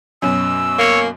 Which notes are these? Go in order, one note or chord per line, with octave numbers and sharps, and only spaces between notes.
F#2 B2 C#4 E6
A#3 C#5